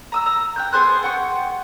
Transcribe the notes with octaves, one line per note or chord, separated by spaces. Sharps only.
A#5 D#6 E6
A#5
G5 F#6 G6
B3 G#4 C5 F#6
F#5 G5 C#6